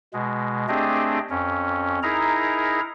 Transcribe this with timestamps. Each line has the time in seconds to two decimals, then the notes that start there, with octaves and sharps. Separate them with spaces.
0.13 B2 G#3
0.68 A3 C4 D4 G4 G#4 D#5
1.30 F2 C#4
2.03 D#4 E4 G#4 A#4 A#5